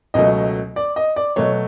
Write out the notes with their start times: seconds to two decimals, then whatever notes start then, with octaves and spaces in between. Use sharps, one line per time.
0.14 C#2 B2 F#3 A3 D#5
0.76 D5
0.96 D#5
1.16 D5
1.36 B2 F#3 A3 C#5